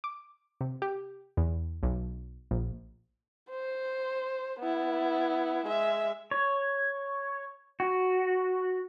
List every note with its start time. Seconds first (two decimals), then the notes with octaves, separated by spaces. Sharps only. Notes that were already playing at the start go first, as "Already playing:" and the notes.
0.04 D6
0.61 C3
0.82 G4
1.37 E2
1.83 B1
2.51 A#1
3.50 C5
4.60 B3 E4
5.66 G#3 E5
6.31 C#5
7.80 F#4